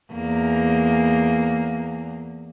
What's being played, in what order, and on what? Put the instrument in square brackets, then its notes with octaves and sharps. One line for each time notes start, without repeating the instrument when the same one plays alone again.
[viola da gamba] E2 A#3